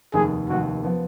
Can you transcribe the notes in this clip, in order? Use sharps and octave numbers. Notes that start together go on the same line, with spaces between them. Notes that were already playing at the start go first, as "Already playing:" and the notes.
F1 D#2 D#3 G#4
F1 D#2 D#3 F#4
F3 B3